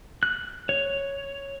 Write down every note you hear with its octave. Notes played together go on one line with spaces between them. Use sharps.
F#6
C#5